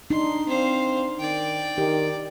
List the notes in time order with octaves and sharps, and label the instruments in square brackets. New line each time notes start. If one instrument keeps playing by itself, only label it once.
[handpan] D4 D#4 [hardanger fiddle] C6
[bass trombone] C4 [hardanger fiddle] C5 F5
[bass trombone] D#3 [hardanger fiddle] D5 G5
[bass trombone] D#3 [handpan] G4